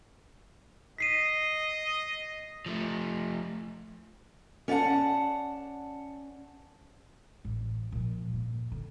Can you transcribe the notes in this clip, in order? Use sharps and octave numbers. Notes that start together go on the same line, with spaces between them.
D#5 B6 C7 D#7
F3 A3
C#4 D5 E5 F#5 A5
A1
A#2 F3
G2 A#3
D3